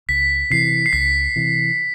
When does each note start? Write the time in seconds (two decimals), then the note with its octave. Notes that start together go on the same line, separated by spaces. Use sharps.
0.09 C#2 B6
0.50 C3 E3 C7
0.86 C7
0.93 C#2 B6
1.36 C3 E3